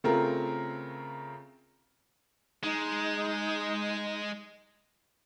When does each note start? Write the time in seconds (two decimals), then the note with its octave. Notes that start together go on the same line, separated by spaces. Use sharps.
0.04 C#3 A3 C4 F4 A#4
2.63 G#3 D#4